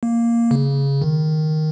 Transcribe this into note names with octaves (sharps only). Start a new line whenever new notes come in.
A#3
C#3
D#3